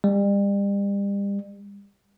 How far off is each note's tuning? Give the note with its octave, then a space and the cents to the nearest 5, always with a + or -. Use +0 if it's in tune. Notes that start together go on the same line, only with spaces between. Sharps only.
G3 +35